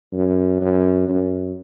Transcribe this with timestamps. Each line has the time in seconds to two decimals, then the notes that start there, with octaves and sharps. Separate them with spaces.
0.13 F#2
0.61 F#2
1.09 F#2